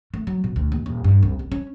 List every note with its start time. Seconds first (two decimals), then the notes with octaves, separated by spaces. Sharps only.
0.14 A3
0.27 F#3
0.44 B2
0.56 D2
0.72 D#2
0.86 D#1
1.04 G2
1.23 C2
1.39 C2
1.52 C#4